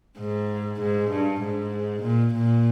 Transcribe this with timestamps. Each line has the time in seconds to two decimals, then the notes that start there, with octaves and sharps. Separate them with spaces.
0.20 G#2
0.81 G#2
1.11 G2
1.42 G#2
2.03 A#2
2.34 A#2